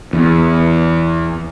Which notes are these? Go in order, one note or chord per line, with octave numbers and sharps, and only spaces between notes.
E2